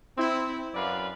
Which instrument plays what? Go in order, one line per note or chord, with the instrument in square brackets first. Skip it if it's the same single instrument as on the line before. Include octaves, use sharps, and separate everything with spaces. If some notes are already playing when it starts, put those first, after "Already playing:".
[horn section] C4 E4
F#2 B4 D5 F5